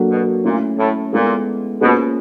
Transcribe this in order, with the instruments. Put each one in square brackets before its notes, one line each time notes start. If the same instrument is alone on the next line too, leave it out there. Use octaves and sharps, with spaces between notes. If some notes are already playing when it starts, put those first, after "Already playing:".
Already playing: [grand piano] F#3 A#3 D4 F#4 A4
[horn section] B2
[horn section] A#2 [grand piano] A3 C#4 E4
[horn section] A2
[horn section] A#2 [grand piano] G#3 B3 E4 A4
[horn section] B2 [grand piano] A#3 C#4 F4 G#4 C5